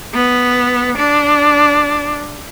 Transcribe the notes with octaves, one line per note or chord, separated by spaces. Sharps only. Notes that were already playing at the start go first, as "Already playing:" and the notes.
B3
D4